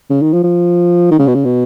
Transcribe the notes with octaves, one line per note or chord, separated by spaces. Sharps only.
C#3
D#3
F3
F3
D#3
C#3
B2
C#3
B2